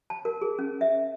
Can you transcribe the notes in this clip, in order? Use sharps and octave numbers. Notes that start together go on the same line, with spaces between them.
A5
A#4
G#4
C#4
E5